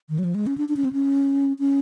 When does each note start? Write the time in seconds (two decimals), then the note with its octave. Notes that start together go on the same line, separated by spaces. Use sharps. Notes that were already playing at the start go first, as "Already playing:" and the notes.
0.09 D#3
0.19 F#3
0.24 F3
0.35 G#3
0.47 C#4
0.58 D4
0.69 D4
0.76 C#4
0.85 C4
0.93 C#4
1.59 C#4